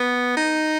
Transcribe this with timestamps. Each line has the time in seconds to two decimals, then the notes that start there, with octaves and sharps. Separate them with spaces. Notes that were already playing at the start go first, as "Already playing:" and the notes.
Already playing: B3
0.37 D#4